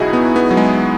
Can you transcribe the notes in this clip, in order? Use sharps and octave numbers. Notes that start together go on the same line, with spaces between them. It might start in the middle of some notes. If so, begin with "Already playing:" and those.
Already playing: C#2 B2 F#3 D#4 E4 F#4 G#4
B3
B3
F#3
G#3